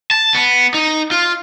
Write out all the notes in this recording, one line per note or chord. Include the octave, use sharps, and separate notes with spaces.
A5
B3
D#4
F4